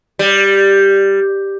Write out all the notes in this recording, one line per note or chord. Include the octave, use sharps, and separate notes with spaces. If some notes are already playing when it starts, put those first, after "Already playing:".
G3